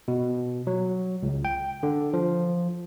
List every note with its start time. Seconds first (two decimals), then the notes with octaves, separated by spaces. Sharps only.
0.08 B2
0.67 F#3
1.23 C#2
1.45 G5
1.83 D3
2.13 F3